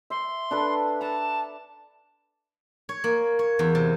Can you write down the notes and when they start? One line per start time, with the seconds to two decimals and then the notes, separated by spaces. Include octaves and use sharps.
0.10 E5 C6
0.51 D4 A4 B4
1.01 A5 A#5
2.89 C#5
3.04 A#3
3.39 C#5
3.59 E2
3.75 C3